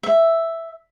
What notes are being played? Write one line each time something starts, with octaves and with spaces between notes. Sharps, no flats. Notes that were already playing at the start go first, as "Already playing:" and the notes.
E5